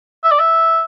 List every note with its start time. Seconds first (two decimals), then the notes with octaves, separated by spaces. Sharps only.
0.24 E5
0.31 D5
0.39 E5